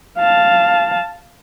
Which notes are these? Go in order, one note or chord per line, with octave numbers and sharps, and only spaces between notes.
F5 A5